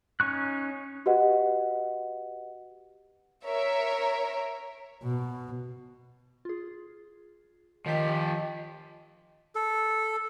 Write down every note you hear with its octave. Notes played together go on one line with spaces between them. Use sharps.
C#4 D#4 C#6 F#6
F#4 G4 B4 D#5 F#5
A#4 C#5 E5
B2
F4 G#4
D#3 F3 G4 D#5 B6
A4